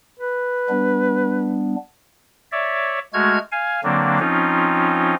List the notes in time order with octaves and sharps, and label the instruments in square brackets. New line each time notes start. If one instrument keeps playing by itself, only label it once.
[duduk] B4
[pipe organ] G3 B3 D4
C#5 D5 E5
G#3 A3 F#4 F6 G#6
F5 G#5
D3 F#3 A#3 C4 D4
F3 C4 C#4 D#4 F4